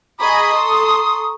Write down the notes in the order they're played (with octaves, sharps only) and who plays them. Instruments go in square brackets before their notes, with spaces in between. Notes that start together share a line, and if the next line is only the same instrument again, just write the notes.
[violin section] G#4 D#5 [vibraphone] A#5 C#6 [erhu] B5 [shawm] D#6
[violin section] A4 [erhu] C6